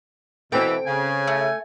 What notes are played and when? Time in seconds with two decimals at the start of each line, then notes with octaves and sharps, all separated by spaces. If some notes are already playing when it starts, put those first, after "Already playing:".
0.52 B2 E3 C4 A4 G5
0.86 C#3 G#5
1.27 A3